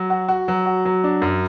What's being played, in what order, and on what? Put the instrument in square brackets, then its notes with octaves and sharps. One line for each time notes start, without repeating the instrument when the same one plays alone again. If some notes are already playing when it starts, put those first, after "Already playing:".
Already playing: [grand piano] F#3
F#4
F#4
F#3
F#4
F#3
D4
F#2